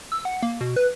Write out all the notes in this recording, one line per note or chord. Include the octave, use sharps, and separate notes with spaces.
E6
F#5
A#3
B2
B4